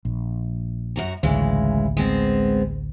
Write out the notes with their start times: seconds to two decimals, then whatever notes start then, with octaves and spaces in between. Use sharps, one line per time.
0.05 A#1
0.96 F#2 F#4 A#5
1.23 A1 D2 C#3 E3 G#3
1.97 G#3 B3 C4